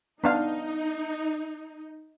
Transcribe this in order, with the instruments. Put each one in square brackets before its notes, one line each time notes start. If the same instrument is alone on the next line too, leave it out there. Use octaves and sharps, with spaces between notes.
[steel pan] B3 D4 F5 [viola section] D#4